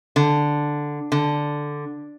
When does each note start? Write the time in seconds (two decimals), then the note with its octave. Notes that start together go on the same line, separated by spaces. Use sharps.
0.16 D3
1.12 D3